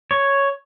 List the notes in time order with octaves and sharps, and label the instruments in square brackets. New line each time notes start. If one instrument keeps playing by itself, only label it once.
[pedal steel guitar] C#5